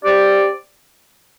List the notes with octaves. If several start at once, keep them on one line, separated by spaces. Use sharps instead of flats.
C4 G4 D5